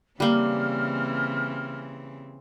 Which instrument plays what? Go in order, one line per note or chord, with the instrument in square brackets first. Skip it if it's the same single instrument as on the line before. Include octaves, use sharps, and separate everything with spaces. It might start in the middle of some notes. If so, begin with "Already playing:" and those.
[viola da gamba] C#3 E3 C4 [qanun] G3 A#3 [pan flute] F6